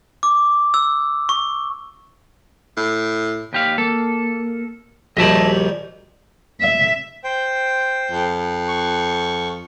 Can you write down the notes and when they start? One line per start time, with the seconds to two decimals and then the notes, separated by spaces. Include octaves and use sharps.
0.23 D6
0.74 E6
1.29 C#6
2.77 A2
3.53 D#2 G4 F5
3.78 A#3 A4
5.17 A#1 D#2 G3 F#4 G#4 D#5 E5 A5
6.61 E5
7.24 C5 G5
8.11 F2
8.68 C#6